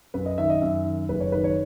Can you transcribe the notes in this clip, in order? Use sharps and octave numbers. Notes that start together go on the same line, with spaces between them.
F#2 B4
D#5
D#3 E5
D#5
F#2 E5
D#3
F#1 B4
C#5
D#3 B4
C#5